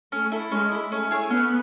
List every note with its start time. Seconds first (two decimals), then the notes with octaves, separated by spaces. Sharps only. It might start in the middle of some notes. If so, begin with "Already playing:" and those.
0.12 A3 C#4
0.32 E4 A4
0.51 G#3 C#4
0.72 E4 A4
0.91 A3 C#4
1.11 E4 G#4 C#5
1.30 B3 C#4